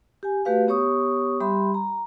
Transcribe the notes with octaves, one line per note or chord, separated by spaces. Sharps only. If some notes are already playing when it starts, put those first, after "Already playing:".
G4 G#5
A3 F#4 G4 B4 F5
B3 G4 C#5 C#6 D#6
G3 G4 E5 B5 C6
A#5